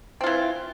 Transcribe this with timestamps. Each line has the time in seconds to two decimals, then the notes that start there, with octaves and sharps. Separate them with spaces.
0.21 C4
0.24 F4
0.26 E3